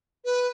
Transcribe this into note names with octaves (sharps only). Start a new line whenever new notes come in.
B4